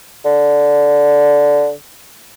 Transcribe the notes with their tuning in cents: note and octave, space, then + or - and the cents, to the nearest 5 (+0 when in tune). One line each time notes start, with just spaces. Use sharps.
D3 -10